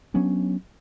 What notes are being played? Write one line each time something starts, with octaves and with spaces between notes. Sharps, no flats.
F#3 B3 C#4 D4